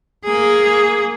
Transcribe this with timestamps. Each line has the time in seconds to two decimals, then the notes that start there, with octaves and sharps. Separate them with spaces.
0.24 A#3 G#4